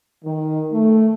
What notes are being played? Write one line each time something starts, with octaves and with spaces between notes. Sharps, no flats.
D#3
A3